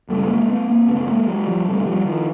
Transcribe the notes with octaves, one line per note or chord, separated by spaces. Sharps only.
G#1 F#2 C#3 G3 A3
B3
G#3 A#3
A3 B3
A#3 C4
G#1 F#2 C#3 A3 B3
G#3 A#3
F#3 G#3
F3 G3
E1 D2 C3 G3 A3
F3 G3
D#3 F3